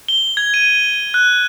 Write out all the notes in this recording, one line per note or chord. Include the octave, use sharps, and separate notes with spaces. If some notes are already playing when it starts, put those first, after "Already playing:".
G7
G#6
D#7
F#6